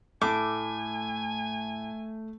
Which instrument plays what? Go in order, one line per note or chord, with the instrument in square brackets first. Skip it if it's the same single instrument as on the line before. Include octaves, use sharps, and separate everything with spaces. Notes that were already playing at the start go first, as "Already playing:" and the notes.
[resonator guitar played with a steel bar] A2 [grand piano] A3 [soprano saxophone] G#5 [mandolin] D6